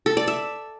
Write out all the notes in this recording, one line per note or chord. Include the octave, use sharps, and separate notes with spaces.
A4
D5
E5